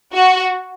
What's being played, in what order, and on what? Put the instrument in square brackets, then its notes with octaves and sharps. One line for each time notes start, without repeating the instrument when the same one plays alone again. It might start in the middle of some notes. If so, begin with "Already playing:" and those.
[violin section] F#4